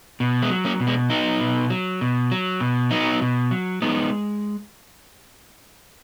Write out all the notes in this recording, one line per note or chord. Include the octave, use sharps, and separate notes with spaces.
B2
G#3 B3
F#3
A#3 C#4
B2
G#3 B3
F#3 B3 D#4
B2
F#3
B2
F#3
B2
F#3 B3 D#4
B2
F#3
G#3 B3 D#4